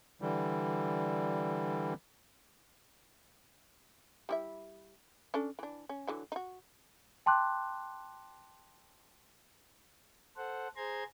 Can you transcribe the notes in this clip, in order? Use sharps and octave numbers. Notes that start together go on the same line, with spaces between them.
D3 E3 G3
G3 E4 E5
C#4 D4 A4
E3 D4
C#4
D3 E3 F#3
D#4 F#4
G5 A5 C6 D6 F#6
A4 C5 F#5
G#4 C5 A#5 C6 G#6